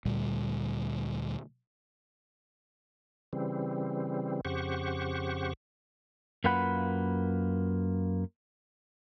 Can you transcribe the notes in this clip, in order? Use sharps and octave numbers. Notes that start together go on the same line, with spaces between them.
D2 A#2 G3
C#3 E3 G3 C4
F2 C#3 G4 C5 F#5 C#6
F#2 A#3 F4 B4 F#5 B5